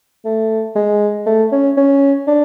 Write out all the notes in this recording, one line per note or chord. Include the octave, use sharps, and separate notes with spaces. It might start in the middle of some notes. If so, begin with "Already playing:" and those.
A3
G#3
A3
C#4
C#4
D4